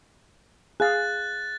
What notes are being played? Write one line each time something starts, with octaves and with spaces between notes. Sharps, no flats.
G#4 F5 F#6 A6